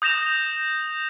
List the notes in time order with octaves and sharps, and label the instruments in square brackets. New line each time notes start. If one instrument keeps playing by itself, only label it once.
[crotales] D#6 G6 A#6 E7 F7